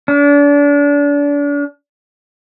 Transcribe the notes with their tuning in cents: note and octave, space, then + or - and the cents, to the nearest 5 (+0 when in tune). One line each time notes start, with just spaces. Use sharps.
D4 -35